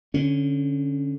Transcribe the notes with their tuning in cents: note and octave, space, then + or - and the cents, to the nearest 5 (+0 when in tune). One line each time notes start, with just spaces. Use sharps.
D3 -15 C#4 +0